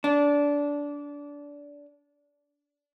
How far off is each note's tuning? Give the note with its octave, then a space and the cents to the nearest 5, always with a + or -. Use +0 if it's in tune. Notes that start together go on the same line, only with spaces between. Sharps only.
D4 -20